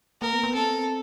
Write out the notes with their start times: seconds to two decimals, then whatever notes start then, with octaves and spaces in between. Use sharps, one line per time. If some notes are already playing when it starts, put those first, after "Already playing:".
0.22 A#3 A#4
0.33 B3
0.43 B3
0.54 C4 A4